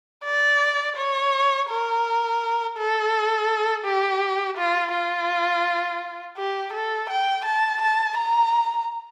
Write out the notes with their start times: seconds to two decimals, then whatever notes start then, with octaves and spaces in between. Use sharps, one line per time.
0.24 D5
0.96 C#5
1.69 A#4
2.77 A4
3.85 G4
4.57 F4
4.93 F4
6.38 G4
6.73 A4
7.10 G5
7.45 A5
7.82 A5
8.17 A#5